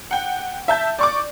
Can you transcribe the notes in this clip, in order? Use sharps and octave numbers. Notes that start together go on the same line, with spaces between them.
F#5 G5
E5 A5 G6
D5 C#6 D6